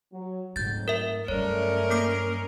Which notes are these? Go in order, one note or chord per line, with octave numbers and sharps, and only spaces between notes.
F#3
F2 G#2 F#3 A3 G6 A6
A#4 E5
G2 F#3 A3 C#4 A#4 C#5 D5
A#3 D6 C7